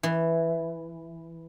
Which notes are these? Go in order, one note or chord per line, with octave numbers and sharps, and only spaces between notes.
E3